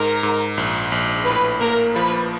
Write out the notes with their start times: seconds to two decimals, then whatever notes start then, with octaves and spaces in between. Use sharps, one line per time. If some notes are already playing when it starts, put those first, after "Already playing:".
Already playing: G#2 A#4
0.23 G#2
0.57 A#1
0.92 A#1
1.26 A2 B4
1.60 A#3 A#4
1.95 F3 B4